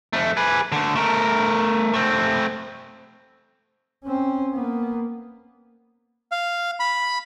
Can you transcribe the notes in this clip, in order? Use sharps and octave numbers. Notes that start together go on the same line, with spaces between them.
F2 A3
G#4 B4
D3 A3
A3 A#4
A3 C4
C4 C#4
A#3 B3
F5
B5